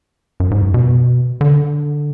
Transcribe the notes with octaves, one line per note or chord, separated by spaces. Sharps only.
F#2
G#2
F#2
B2
D3